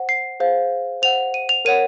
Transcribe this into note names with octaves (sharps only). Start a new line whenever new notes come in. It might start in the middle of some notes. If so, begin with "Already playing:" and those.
Already playing: C5 F#5
C7
G#4 C5 F5
C5 F#5 F7
D#7
F7
A#4 C#5 F#5 D#7